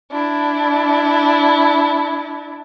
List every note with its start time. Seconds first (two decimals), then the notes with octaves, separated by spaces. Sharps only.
0.11 D4 E4